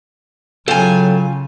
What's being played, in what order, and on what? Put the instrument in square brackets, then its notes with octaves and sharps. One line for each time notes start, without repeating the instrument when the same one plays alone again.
[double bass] C#3 [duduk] F#3 [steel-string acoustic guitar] F4 G#5 [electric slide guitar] A4 G5